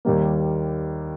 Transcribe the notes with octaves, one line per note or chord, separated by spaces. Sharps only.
D#2 D#3 G3 A#3